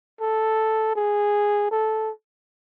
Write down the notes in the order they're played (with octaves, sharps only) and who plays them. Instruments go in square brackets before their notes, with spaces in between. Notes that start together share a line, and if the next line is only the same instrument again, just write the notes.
[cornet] A4
G#4
A4